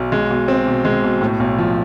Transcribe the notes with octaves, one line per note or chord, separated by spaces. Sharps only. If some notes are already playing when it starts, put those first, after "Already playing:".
Already playing: B1
G#3
B2
C4
B2
G#3
B2
A2
B1
F3